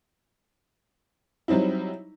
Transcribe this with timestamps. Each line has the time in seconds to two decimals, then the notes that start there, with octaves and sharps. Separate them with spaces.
1.48 F#3 G3 C4 D#4 E4